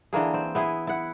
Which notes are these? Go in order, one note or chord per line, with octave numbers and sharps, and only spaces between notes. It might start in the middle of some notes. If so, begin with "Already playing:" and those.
D3 E3 A#3 G#4
C4
B3 E4 G#4
E4 F#5